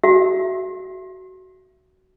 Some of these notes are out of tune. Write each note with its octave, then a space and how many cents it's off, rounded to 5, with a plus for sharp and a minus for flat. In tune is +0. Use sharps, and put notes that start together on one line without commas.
F#4 +15 E5 +15